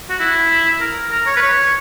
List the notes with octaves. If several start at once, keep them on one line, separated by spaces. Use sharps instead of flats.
F#4
E4
A#4
A#4
C#5
B4
C#5